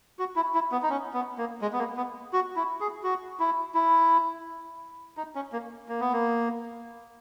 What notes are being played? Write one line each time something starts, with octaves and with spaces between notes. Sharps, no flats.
F#4
E4
E4
B3
D#4
C#4
B3
A#3
G#3
B3
A#3
B3
F#4
E4
G#4
F#4
E4
E4
D#4
C#4
A#3
A#3
B3
A#3